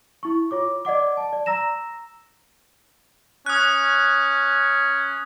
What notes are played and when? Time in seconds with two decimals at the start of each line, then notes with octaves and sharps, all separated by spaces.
0.23 E4 C#6
0.51 F4 C#5 D6
0.85 D5 D#5 F#5 D6
1.17 A5
1.33 D5
1.46 A#5 E6 A#6 E7
3.46 C#4 D#6 F#6